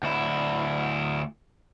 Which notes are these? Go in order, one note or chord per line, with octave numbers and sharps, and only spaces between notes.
D2 E4